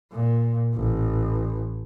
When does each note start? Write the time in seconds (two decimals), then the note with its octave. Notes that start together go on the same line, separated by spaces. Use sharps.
0.12 A#2
0.75 A1